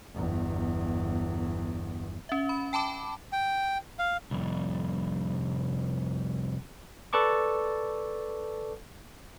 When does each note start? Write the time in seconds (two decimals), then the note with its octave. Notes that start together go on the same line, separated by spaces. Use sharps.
0.15 G1 E2
2.29 C#4 E5
2.49 B5
2.73 G5 A5 B5 D6
3.33 G5
3.99 F5
4.31 C2 F2
7.13 A4 B4 D5 A5 C#6 D6